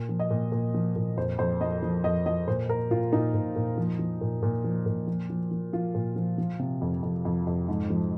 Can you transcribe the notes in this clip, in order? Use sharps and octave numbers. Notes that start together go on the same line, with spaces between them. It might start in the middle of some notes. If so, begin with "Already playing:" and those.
Already playing: A#2
F3
D#5
A#2
A#2
F3
A#2
F2 C5
F2 C5
F3 D#5
F3
F2 D#5
F3 D#5
A#2 C5
A#2 A#4
A#2 F4
A#2 D#4
A#2
A#2
F3
F3
A#2
A#2
F3
A#2
F3
F3
F3
F3 F4
A#2
F3
F3
C3
F2
F2
F2
F2
G#2
F3